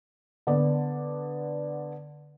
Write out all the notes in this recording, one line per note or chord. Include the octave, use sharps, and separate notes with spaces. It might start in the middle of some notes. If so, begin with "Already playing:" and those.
D3 B3 D5